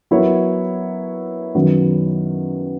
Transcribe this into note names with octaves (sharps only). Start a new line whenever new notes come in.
F#3 B3 E4 A#4 C#5
F#2 D#3 F#3 B3